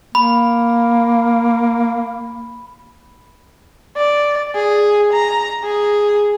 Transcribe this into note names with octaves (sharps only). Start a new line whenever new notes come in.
A#3 B5
D5
G#4
A#5
G#4